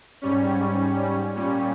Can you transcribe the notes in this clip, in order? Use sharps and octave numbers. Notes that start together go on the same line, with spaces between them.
G#2 G3 C#4
A#2 G3 C#4